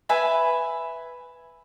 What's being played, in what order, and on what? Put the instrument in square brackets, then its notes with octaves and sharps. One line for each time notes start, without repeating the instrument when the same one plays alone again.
[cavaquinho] B4 E5 G#5 B5